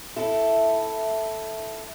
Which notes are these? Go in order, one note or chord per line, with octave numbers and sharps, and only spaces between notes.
E4 A4